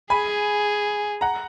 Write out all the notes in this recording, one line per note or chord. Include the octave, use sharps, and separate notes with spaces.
G#4 G#5 B5
F#5 A#5